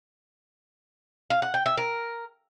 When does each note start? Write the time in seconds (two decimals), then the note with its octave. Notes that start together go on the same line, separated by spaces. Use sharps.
1.30 F5
1.42 F#5
1.54 G5
1.66 E5
1.77 A#4